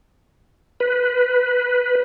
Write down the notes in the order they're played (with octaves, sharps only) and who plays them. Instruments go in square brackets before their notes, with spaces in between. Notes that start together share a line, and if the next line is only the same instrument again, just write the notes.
[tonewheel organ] B4